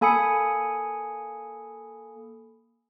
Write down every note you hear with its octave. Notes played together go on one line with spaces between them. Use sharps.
A#3 A4 G#5 B5 D#6 C#7